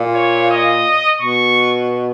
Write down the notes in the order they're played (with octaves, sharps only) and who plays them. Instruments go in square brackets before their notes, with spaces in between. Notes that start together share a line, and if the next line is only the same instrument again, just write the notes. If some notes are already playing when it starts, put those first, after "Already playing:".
Already playing: [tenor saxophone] A#2
[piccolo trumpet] C#5
D#5
[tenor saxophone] B2 [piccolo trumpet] C#6